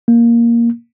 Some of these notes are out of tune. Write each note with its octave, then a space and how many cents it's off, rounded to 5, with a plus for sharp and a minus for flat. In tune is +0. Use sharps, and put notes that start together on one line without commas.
A#3 +5